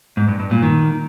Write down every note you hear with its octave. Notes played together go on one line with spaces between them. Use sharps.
G#2
G2
G2
A#2
D#3